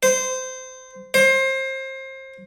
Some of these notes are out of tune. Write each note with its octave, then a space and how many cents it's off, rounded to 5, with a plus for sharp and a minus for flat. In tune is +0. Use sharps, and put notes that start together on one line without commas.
C5 -20
C5 +25